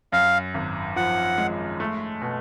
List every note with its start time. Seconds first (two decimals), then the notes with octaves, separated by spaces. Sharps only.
0.13 F#2 F5
0.54 G#1
0.96 F3 F#5
1.38 G#3
1.80 A3
2.22 B2